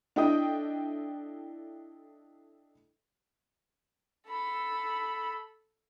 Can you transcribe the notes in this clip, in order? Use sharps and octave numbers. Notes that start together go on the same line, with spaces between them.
D4 E4 A4 D#5 G5 D#6
A4 B5